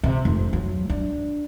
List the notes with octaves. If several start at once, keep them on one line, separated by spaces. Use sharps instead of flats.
C3
F1
F#3
D4